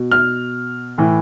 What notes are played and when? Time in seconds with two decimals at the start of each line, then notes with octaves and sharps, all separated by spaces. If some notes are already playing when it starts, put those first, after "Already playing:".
Already playing: B2
0.12 F6
0.98 A2 E3